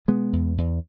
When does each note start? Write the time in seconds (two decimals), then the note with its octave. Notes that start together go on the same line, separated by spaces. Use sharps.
0.08 B2 G#3 B3
0.33 E2
0.58 E2